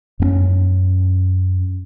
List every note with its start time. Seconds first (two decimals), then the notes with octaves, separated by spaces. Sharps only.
0.20 F#2 B3 C#4